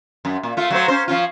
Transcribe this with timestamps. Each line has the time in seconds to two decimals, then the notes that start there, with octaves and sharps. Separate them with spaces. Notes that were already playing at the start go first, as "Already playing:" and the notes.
0.25 F#2
0.43 A#2
0.57 A3 F4
0.70 F#3 A3 C5
0.88 C#4 C5
1.08 F3 C#4 F4